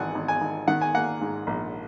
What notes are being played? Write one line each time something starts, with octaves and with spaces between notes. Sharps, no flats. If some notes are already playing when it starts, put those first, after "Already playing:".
Already playing: G#1 E3 F#5 G#5
G#1
G#5
G#1
D#3 F#5
G#5
A#3 F#5
G#2
A#1